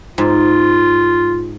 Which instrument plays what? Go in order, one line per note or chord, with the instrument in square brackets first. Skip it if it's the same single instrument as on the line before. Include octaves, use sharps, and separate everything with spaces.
[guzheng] G#2 [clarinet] F4